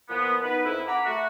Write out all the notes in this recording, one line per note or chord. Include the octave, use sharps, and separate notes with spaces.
A#2 F3 B3
B3 D#4 B4
F2 E4
F#5 A#5 B5 D6
A3 F#4